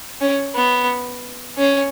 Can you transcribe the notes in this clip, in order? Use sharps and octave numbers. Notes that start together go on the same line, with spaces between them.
C#4
B3
C#4